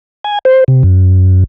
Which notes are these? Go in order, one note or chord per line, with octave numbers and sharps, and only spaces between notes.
G#5
C5
C3
F#2